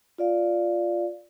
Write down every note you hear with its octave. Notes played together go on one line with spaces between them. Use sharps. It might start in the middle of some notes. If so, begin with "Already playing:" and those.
F4 D5 F5